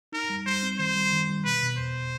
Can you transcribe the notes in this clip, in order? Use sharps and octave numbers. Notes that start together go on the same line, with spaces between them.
D#4 A#4
G3
G3 C5
C4
D#3 C5
G3
D#3
G3
B2 B4
B2
E2 C5